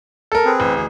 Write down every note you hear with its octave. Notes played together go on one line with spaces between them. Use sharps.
A4 A#4
C4 G#4 B4
A1
D2 G#4